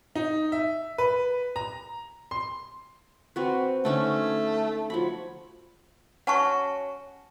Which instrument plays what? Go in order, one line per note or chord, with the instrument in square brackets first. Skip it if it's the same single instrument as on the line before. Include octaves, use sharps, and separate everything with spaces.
[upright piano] D#4
E5
B4
A#5
C6
[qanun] C4 F#4 B4
[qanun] D3 C#4 D#4 [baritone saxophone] A3
[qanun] F3 F#3 B5
[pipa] C#4 F#4 [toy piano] F#5 A5 C#6